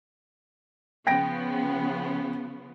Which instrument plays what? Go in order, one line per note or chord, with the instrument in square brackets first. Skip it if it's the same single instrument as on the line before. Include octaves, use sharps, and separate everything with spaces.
[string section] C#3 F3 B3 [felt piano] G5 A#6 D7